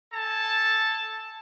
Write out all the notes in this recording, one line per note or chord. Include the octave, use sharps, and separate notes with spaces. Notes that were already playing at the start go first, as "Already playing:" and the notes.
A4 G#5 A5